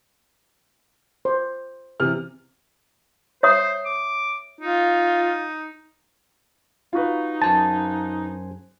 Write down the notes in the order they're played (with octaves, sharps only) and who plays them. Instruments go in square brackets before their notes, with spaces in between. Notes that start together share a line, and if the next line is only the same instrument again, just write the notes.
[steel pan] C5
[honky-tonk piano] C3 E3 F6
[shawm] C5 [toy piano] C#5 E5 D#6
[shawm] D6
[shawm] D#4 [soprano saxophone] F4
[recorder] D#4 [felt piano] F4 F#4 B4
[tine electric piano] F#2 C5 G#5 [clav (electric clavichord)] A5